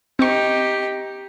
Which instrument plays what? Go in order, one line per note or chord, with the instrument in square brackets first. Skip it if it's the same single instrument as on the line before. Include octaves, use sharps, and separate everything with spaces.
[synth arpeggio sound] C4 C#6 [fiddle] D#4 G4